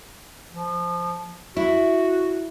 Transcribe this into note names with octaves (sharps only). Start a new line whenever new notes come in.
F3
E4 F#4